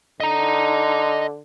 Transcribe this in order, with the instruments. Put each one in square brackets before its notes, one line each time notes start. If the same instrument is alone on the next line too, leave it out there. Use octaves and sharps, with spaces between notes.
[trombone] D3 [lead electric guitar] D#5 A#5